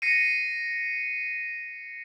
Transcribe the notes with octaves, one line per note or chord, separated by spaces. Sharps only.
A#6 C7 C#7 D#7